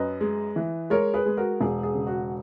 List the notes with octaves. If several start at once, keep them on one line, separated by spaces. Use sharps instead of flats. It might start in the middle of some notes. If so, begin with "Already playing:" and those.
Already playing: F#2 B4 D#5
G#3
E3
G#3 A#4 C#5
G#4 B4
G#3
F#4 A#4
E1 G#4
G#4
C#3
F#4